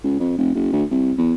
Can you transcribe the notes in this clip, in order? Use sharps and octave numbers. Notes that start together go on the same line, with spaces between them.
C#2
F2
F1
F#1
D2
C2
E2